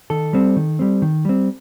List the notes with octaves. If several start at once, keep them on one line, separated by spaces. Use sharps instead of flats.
D#3 A4
G3 C4
D#3
G3 C4
D#3
G3 C4